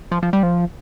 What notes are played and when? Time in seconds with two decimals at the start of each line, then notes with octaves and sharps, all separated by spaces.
0.12 F3
0.23 F3
0.33 G3
0.43 F3